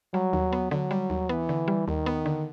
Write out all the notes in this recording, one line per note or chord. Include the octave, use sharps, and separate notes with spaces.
F#3 G3
D#2
B3
D3 F#3
G3
D#2
E3 B3
D3
G3
D#2 D#3
B3
D3